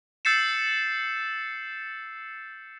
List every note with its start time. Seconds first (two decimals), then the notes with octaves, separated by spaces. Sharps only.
0.25 E6 G6 A6 C7 C#7 E7